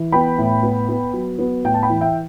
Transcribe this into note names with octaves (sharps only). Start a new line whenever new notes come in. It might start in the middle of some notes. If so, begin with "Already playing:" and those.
Already playing: E3
B3 G5 B5
A2
B3
B3
F#3
B3
A2 G5
A5
G5 B5
E3
E5 G5